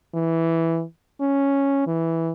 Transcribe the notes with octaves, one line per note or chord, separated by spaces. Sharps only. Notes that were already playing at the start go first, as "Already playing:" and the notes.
E3
C#4
E3